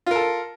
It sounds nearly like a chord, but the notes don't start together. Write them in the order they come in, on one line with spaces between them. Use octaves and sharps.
F4 A#4 A4